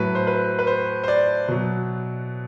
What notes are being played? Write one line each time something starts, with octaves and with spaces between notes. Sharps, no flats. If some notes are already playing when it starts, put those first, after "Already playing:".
Already playing: A2 F#3 B4
C5
B4
B4
C5
C5
D5
B2 F#3